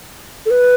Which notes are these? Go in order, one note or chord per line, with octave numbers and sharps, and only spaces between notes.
A4
B4